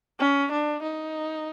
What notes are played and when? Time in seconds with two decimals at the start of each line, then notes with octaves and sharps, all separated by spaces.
0.20 C#4
0.52 D4
0.83 D#4